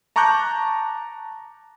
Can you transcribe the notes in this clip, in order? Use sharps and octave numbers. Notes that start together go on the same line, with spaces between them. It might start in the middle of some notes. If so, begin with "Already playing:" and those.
A5 A#5 C#6 D6 F#6 G6